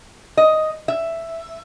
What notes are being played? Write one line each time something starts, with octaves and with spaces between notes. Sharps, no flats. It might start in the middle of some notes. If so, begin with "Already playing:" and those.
D#5
E5